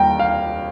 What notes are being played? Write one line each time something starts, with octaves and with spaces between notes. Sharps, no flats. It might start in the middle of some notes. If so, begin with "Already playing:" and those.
Already playing: D#2 G3 G5 A#5
F5